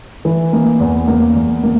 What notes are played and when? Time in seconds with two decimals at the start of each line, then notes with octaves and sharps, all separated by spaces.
0.25 E3
0.53 A#3
0.80 E2
1.08 A#3
1.35 E2
1.63 A#3